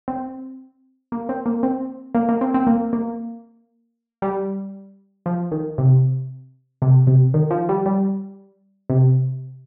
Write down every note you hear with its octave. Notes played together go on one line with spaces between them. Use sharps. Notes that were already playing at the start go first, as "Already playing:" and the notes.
C4
A#3
C4
A#3
C4
A#3
A#3
C4
C4
A#3
A#3
G3
F3
D#3
C3
C3
C3
D#3
F3
G3
G3
C3